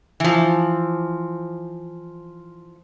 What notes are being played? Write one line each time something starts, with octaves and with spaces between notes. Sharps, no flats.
E3 F3